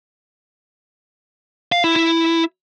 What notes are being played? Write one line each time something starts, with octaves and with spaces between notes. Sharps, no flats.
F5
E4
E4